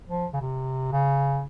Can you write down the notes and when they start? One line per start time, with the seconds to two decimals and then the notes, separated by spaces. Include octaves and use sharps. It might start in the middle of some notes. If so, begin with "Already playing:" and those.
0.08 F3
0.33 C#3
0.41 C3
0.92 C#3